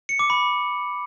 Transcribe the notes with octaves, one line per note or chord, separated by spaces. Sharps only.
C#7
D6
B5